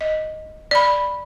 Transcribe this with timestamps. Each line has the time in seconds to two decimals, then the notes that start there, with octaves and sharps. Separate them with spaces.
0.01 D#5
0.71 D5 B5